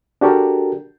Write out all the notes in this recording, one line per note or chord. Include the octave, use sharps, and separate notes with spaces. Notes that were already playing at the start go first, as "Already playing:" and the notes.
D4 F#4 G4 A4 A#4